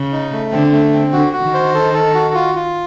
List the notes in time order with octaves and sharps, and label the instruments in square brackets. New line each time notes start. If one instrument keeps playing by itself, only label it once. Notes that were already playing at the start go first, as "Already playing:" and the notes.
Already playing: [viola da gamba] C#3
[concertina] D#4
A3
[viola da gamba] D3 [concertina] C4
[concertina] A3
C4
[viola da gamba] D3 [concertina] F#4
[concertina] F#4
[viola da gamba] D#3
[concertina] C5
A4
A4
F#4
F4
F4